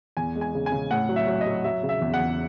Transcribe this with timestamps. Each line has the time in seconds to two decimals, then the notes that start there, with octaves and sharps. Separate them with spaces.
0.17 E2 G#5
0.36 G#3
0.41 G#5
0.55 C#3
0.66 G#5
0.72 C#3
0.91 A2 F#5
1.09 F#3
1.16 E5
1.27 F#3
1.41 D#5
1.47 F#3
1.64 F#3 E5
1.83 C#3
1.89 E5
2.02 E2
2.14 F#5
2.20 E2